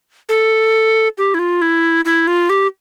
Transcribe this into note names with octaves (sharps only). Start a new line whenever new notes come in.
A4
G4
E4
F4
E4
E4
F4
G4